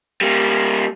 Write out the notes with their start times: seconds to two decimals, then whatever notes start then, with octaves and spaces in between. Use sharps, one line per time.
0.21 G3 A#3